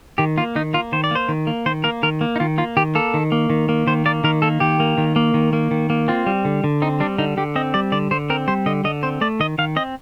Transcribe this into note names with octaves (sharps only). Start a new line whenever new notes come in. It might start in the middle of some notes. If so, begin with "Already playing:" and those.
D#3 G4
A#3 F4
D#3 D#4
A#3 F4
D#3 C5
D5
A#3 C5
D#3
A#3
D#3 C5
A#3 A#4
D#3 A#4
A#3
D#4
D#3 F4
A#3 F4
D#3 G4
A#3 A4
D#3
A#3
D#3
A#3
D#3 C5
A#3 D5
D#3 A#4
A#3 A4
D#3 G4
A#3
D#3
A#3
D#3
A#3
D#3
A#3
C4 F4
G3
D3
D3
C4 D#4
G3 D4
D3 D#4
D3 G4
C4 D#5
G3 D5
D3 D5
D3 C5
C4 A#4
G3 C5
D3 D#5
D3 D#5
C4 C5
A3 D5
D#3 D#5
D#3 F5
C4 D#5